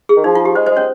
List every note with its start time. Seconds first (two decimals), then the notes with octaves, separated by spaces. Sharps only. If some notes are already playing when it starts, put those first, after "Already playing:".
0.09 G#4
0.16 D#3
0.24 F3 D#4
0.35 F4
0.45 G4
0.55 G#3 C5
0.66 C5
0.71 G#3
0.77 C#4 C#5